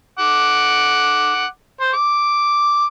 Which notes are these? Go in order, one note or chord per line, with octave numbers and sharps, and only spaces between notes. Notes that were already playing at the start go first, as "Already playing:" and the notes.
F#5 D6
C5
D6